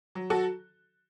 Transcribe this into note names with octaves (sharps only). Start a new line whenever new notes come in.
F#3
F#4 A4